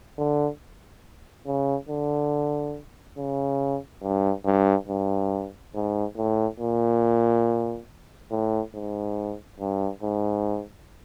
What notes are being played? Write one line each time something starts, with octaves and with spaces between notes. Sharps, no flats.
D3
C#3
D3
C#3
G2
G2
G2
G#2
A2
A#2
A2
G#2
G2
G#2